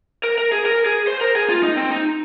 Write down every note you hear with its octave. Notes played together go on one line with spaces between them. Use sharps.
A#4
A#4
G#4
A#4
G#4
C5
A#4
G#4
F4
D#4
C4
D#4